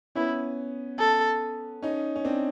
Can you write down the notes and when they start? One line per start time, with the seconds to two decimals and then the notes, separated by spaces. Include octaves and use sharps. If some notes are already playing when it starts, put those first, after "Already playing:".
0.15 B3 C#4 E4
0.99 A4
1.82 C#4 D#4
2.16 C#4
2.25 C4 D4